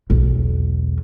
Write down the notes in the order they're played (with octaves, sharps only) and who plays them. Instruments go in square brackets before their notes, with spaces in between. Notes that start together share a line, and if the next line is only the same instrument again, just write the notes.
[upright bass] B1 E2